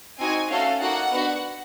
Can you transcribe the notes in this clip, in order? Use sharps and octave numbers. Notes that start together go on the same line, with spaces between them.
C4 D#4 F#4 G#5
A3 C#4 F#4 A4 F5
A#3 D#4 F#4 A4 F#5
B3 D4 F#4